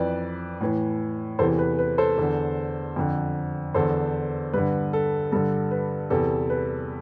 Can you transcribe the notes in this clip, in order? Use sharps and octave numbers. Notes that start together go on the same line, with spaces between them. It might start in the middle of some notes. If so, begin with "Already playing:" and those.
Already playing: F2 E3 B4 D5
A2 E3
E2 C3 E3 A4 C5
B4
B4
A4 C5
E2 D3
F2 D3
E2 D3 A4 C5
G2 D3 B4
A4
G2 D3 A4
B4
E2 C3 E3 A4
B4